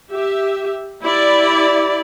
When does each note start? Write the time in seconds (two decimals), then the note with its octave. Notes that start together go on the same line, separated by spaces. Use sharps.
0.11 G4 E5
1.04 E4 G4 D5